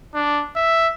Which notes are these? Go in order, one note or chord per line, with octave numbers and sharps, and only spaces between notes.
D4
E5